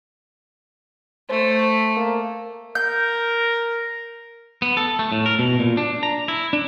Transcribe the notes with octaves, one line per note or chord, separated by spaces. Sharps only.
A3 C5
A#3
A#4 G6
B3
A4
A3
A2
A#4
B2
A#2
D4
A#5
E4
D4